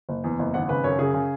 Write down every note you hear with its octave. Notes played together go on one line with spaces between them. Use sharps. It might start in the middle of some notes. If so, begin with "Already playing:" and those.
F#1
E2
F#1
G#1 F#5
C#3 B4
F#2 C#5
C#3 G#4
C#3